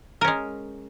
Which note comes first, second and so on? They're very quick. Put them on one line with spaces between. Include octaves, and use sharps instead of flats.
A#4 C#4 G#3